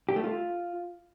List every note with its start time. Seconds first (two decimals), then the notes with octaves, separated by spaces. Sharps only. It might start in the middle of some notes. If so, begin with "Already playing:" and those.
0.09 G4
0.16 A3
0.24 F4